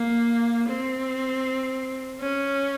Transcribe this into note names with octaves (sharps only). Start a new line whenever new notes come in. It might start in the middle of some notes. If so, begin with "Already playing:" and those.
Already playing: A#3
C4
C#4